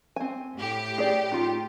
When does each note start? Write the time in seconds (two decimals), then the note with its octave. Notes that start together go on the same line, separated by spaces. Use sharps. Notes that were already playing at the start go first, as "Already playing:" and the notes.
0.16 C4 G#5
0.56 A2 G4
0.98 G#4 D5
1.32 D#4 F4